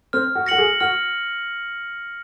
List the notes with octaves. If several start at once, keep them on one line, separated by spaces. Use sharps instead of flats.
C4 F6
F#4
F#4 A#6 C#7 F#7
G#4
F#4 F6